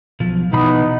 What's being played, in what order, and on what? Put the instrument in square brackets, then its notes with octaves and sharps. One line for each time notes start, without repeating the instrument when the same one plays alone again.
[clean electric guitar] B1 F3
[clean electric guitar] B2 E3 B5 [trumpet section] B3 D#4